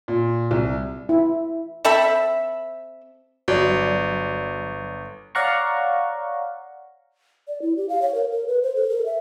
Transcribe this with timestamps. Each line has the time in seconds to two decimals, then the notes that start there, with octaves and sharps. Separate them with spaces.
0.08 A#2
0.51 C2
1.09 E4
1.85 C4 A4 E5 B5
3.48 G1 F#3 D5
5.35 C#5 D5 F5 F#5 A#5 C#6
7.48 D5
7.62 E4
7.77 G4
7.89 F5
8.02 C#5
8.14 A#4
8.32 A#4
8.48 B4
8.63 C5
8.76 A4
8.90 A#4
9.06 E5